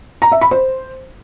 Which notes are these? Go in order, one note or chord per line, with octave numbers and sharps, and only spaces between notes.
A#5
E5
B5
C5